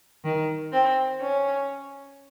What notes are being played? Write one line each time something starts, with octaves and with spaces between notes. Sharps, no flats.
D#3
C4
C#4